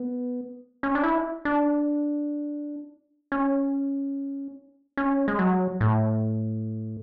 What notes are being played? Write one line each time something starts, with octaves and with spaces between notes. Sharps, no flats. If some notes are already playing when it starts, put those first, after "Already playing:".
Already playing: B3
C#4
D4
E4
D4
C#4
C#4
G#3
F#3
A2